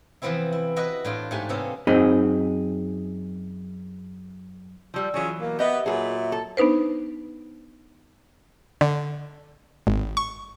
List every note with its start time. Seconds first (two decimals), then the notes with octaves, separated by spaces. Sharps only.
0.22 C3 E3 F3 B3 C4 E4
0.52 E4
0.76 E4 F#4 B4 D#5
1.05 A2 D4 F4
1.31 G#2 A3 G4 G#5
1.49 C3 A#3 B3 C#4 A4
1.87 F#2 C4 D#4 G#4 D#5 B5
4.94 F3 G3 E6
5.14 E3 F#3 C#4 F4 G#4
5.40 B2 A#3
5.59 B3 G4 D#5 E5
5.86 A#2 F#3 G#4 A4 B4
6.32 A4
6.57 B3 D4 D#4 B4 C5
8.81 D3
9.87 G#1
10.17 C#6